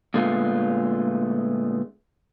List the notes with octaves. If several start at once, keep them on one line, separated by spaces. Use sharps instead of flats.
A#2 D3 G#3 A3 B3 F4